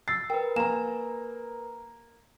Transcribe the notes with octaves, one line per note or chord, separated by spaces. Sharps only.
E6 A6 C7
A#4 B4 G5
A#3 G#5 A#5 E7